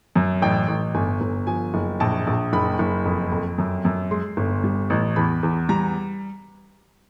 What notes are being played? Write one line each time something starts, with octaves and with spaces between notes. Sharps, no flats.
F#2
A1 G5
A1
G1 G#5
G1
F3 G#5
F#1
A#1 A5
A#1
F#1 B5
F#1
F2
F2
F#2
F#2
G#3 C6
G1
G3
A1
E2 B5
E2
G3 A#5